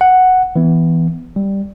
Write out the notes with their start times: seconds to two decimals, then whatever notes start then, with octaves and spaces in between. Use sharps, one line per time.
0.01 F#5
0.56 E3 B3
1.36 G3